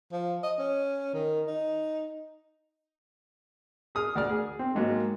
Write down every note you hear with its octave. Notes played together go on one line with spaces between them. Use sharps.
F3
D#5
C#4
D#3
D#4
G#4 D#6 F6
D2 D5 F6
G#4
C4
G#1 G#2 F#3 A#3